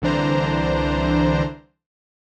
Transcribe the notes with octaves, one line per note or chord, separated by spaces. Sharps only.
C2 D3 E3 D4 C5 A#5